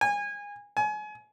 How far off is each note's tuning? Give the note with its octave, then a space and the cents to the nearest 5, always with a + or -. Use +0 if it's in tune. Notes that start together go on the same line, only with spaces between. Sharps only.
G#5 -25
G#5 +30